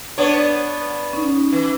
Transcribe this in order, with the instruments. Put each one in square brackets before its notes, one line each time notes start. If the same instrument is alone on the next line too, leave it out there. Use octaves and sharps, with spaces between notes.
[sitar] B3 D4 C#5
[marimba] C#4 D#4
[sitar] E3